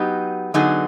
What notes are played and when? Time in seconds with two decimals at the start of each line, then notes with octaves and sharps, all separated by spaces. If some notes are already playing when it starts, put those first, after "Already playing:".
Already playing: F#3 B3 D#4 G4
0.54 D3 F#3 B3 D#4 G#4